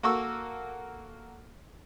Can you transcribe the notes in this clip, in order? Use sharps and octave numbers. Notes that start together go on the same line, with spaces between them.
A#3 F#4 A4 C#6 E6